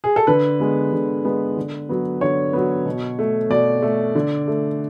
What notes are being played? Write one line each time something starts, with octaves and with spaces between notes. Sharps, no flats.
G#4
A4
D3 B4
G#3 B3
D3
G#3 B3
D3
F#3 B3
D3 C#5
F#3 B3
B2
A3
B2 D5
A3
D3
A3